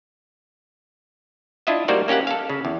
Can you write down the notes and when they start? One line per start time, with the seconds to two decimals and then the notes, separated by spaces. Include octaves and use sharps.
1.67 D4 E4 F4 D#5 E5
1.88 G3 A#3 D#4 F#4 C5 D5
2.08 A#3 C#4 G4 F5 F#5
2.27 A4 F5
2.50 C#3
2.65 E2